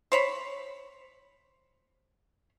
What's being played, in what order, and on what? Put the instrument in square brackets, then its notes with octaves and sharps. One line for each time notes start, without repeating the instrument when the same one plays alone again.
[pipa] C5 C#5 B5